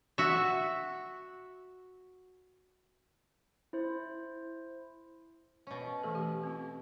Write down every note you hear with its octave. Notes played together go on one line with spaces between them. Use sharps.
F#4 E5
E4 C5
B2 C#4
E3 A3 A4
G4
C4 F4